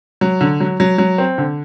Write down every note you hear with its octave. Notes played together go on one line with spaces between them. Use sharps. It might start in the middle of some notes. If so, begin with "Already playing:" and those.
F#3
D3
F#3
F#3
F#3
C4
D3